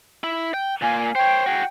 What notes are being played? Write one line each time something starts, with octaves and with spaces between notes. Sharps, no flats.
E4
G5
A#2 A#3 G#5
C5 C#5 G5
F#4 G#4